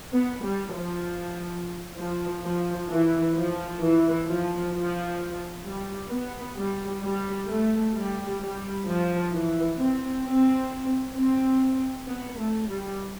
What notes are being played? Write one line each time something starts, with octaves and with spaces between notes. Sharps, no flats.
B3
G3
F3
F3
F3
E3
F3
E3
F3
F3
G3
B3
G3
G3
A3
G3
G3
F3
E3
C4
C4
C4
B3
A3
G3